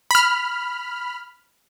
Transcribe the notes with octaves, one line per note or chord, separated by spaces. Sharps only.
B5 F6